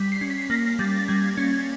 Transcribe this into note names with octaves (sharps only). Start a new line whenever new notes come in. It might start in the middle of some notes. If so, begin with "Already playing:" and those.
Already playing: G3 B6
C7
C#4
B6
B6
A#3 A#6
G3 A6
A6
G3 G#6
C#4 G#6